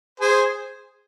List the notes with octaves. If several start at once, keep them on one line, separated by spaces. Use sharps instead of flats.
G#4 C5